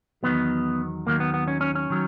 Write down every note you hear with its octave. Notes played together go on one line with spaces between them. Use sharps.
E2 D#3 F#3 B3
D#2 D#3 F#3 A#3
B3
B3
C#4
C#4
C#4
D#3 F#3